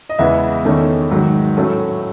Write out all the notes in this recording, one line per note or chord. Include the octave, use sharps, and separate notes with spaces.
D#5
E2 C#3 E3 G#3 B3 E5
E2 D#3 A3 C#4
G#2 D#3 F#3
A2 F#3 A3 C#4